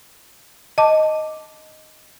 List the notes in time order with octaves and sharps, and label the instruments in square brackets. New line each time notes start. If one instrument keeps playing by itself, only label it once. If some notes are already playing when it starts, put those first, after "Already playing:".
[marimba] D#5 A5 D6